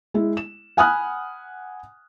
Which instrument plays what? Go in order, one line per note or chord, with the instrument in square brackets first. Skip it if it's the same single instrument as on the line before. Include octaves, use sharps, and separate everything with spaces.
[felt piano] G#3 E4
E7
F#5 G#5 B5 D#6 F6 F#6